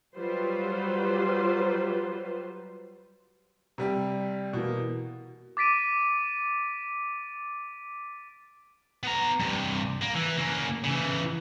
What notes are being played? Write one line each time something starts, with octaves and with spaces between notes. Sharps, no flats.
F#3 G3 F4 B4 C5
C3 G3 G4
B2 E3 A#3
D6 A6 B6 D7 D#7
B3 A#5
G2 C3
A#3
E3
C#3 A#3
C#3 E3